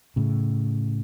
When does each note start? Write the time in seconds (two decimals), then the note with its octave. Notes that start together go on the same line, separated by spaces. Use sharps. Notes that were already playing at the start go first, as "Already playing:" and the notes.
0.16 A2 C#3